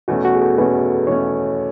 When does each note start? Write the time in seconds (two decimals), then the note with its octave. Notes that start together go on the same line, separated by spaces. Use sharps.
0.08 E2 B2 A3 C#4 F#4
0.25 F#4
0.35 G#4
0.41 A4
0.58 E2 B2 A3 C#4 B4
1.07 E2 B2 A3 C#4 C#5